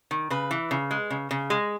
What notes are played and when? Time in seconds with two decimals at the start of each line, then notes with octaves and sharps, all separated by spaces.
0.11 D#3
0.30 C#3 B4
0.51 E3
0.71 C#3
0.91 G#3
1.10 C#3
1.31 C#3
1.50 G#3